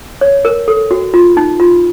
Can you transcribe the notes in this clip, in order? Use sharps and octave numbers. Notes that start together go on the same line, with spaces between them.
C#5
A#4
A4
F#4
F4
D#4
F4